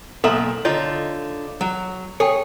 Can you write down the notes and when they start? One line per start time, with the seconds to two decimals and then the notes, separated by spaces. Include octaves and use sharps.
0.24 B1 A#3 A4 E5 F#5 C6
0.65 D3 D#4 F4 C#5
1.61 F#3
2.20 G#4 A4 C#5 G5